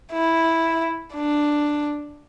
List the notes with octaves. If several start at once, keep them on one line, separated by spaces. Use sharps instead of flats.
E4
D4